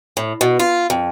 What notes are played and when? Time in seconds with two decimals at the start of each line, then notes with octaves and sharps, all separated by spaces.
0.17 A2
0.41 B2
0.59 F4
0.90 F2